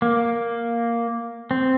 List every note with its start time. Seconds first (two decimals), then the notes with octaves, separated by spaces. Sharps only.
0.02 A#3
1.51 C4